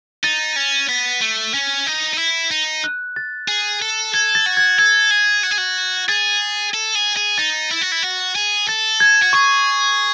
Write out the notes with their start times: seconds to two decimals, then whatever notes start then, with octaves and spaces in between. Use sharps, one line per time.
0.24 D#4 A6
0.56 C#4
0.89 B3
1.21 A3
1.54 C#4
1.86 D#4
2.14 D#4
2.18 E4
2.51 D#4
2.84 F#6
3.16 A6
3.48 G#4
3.82 A4
4.14 A4 G#6
4.35 A6
4.46 F#4
4.57 G#6
4.78 A4 G#6
5.11 G#4
5.43 F#4
5.51 G#4
5.58 F#4
6.08 G#4 A6
6.74 A4
6.95 G#4
7.17 G#4
7.38 D#4 A6
7.71 E4
7.81 F#4
7.92 E4
8.03 F#4
8.36 G#4
8.68 A4 A6
9.00 G#6
9.22 F#4
9.33 G#4 C#6